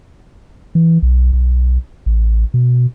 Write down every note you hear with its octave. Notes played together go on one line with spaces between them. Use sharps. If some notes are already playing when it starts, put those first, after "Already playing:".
E3
B1
B1
A1
B2